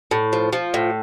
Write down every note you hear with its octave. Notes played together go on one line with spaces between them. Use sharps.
A2
F3
F3
A2